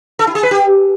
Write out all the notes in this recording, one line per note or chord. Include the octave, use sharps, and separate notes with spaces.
A4
E4
G#4
B4
G4